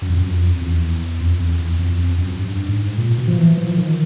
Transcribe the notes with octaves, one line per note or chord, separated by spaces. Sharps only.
F#2
F2
F#2
F2
E2
F2
E2
E2
F2
F2
F#2
G2
G#2
A#2
B2
F3
E3
F3
D#3